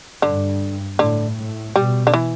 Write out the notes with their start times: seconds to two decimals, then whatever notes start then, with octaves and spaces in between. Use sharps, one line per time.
0.22 G2 D3
0.99 A2 D3
1.37 A2
1.75 B2 G3
2.07 D3
2.14 E3